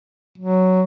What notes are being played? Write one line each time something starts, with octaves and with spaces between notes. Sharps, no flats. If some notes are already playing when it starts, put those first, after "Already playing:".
F#3